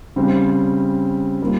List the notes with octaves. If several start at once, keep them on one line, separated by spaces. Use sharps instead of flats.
C#3 G3 C4
G3 A#3 F4